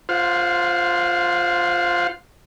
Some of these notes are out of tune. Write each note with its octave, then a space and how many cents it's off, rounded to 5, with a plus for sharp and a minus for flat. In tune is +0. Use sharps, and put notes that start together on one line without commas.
F4 +0 C5 -5 F#5 -40